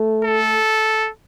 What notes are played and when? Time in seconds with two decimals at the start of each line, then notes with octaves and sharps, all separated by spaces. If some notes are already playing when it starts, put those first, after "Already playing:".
Already playing: A3
0.24 A4